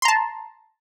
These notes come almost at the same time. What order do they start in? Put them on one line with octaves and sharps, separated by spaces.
C6 A#5 A5